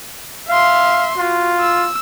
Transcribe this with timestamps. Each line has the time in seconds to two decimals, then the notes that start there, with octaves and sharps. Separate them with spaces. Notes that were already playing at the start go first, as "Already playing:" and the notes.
0.49 E5 F5 C6
1.18 F4 F#4
1.60 E6